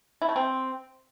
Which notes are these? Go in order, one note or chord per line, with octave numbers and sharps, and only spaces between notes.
E4
A3
C4